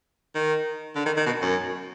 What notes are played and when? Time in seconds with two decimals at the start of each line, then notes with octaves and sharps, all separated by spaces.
0.35 D#3
0.96 D3
1.06 D#3
1.17 D#3
1.26 B2
1.42 F#2